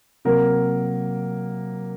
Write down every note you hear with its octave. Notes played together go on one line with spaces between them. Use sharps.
C3 F#3 A#3 A#4